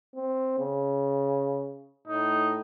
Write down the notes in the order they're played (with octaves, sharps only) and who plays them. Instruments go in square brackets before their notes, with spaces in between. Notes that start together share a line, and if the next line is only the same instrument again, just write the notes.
[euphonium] C4
C#3
[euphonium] A2 [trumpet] D#4